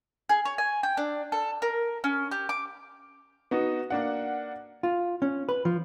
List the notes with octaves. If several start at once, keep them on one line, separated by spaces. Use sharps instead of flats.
G#4
C#5
G#5
G5
D4
A4
A#4
C#4
G4
D6
B3 D#4 F#4
A#3 D4 F#5
F4
C#4
B4
F3